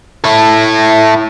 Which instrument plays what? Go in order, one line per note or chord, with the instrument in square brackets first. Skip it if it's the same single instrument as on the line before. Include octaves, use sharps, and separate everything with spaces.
[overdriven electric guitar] E4 A4